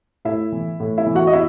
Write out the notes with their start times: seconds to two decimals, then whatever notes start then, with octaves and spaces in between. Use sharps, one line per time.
0.25 A2 E4 E5
0.52 E3
0.80 A2
0.98 E4 E5
1.07 E3
1.15 F#4 F#5
1.27 D#5
1.33 E4 E5